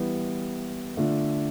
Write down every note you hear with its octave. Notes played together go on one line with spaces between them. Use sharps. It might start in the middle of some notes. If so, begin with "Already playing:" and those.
Already playing: E3 G3 B3
D3 A3 D4 F4